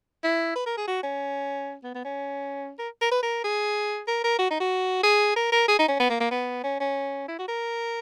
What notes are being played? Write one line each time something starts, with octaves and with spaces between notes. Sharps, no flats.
E4
B4
A#4
G#4
F#4
C#4
B3
B3
C#4
A#4
A#4
B4
A#4
G#4
A#4
A#4
F#4
D#4
F#4
G#4
A#4
A#4
G#4
D#4
C#4
B3
A#3
A#3
B3
C#4
C#4
E4
F#4
A#4